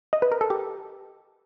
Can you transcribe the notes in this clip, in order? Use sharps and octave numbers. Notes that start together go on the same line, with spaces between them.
D#5
B4
A#4
A4
G4